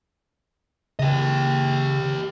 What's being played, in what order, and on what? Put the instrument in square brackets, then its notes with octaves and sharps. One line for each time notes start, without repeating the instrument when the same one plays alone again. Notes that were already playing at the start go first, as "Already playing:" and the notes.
[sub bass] C#3 [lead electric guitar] G4 D#5